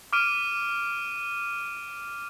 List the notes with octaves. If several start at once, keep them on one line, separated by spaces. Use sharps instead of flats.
D6 F6 D7 D#7